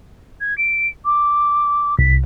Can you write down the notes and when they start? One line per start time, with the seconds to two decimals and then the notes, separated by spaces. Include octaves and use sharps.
0.41 G#6
0.58 D7
1.05 D6
1.99 C2 B6